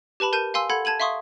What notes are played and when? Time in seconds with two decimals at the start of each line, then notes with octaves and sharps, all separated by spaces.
0.20 G4 B4 A5 B5
0.33 A#4 A5 G6 D#7
0.54 F5 G#5 C6 E6
0.70 A4 F#5 B5 G#6
0.85 A5 G#6 D#7 F#7
1.00 E5 F5 C6 C#6 D#6